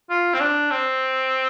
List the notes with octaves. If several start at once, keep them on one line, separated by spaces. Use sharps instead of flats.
F4
C4
D4
C4